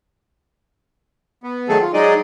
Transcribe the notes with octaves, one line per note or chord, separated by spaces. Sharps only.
B3
D#3 F#3 A3 G#4 A4
F4
F#3 G#3 D#4 G#4 D5 D#5